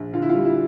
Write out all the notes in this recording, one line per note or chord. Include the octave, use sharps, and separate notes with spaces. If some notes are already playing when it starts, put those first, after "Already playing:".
Already playing: A#1
D3 F4
E4
G3 F4
E4